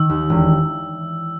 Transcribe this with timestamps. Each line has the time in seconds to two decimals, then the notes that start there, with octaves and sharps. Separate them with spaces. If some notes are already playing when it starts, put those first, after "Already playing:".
Already playing: D#3 E6
0.10 D#2
0.30 E1